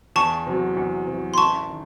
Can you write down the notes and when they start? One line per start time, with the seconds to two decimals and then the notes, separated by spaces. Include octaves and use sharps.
0.16 E2 A5 C#6
0.46 C3 F#3
0.77 E2
1.07 C3 F#3
1.34 C6
1.37 A1 A5 C#6
1.69 D#3